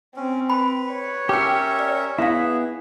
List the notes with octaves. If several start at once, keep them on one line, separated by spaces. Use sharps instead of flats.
C4 C#4
B4 B5
C#5
C#4 G4 A#4 E5 G5 D6
D5
B3 E4 G#4 E5 F5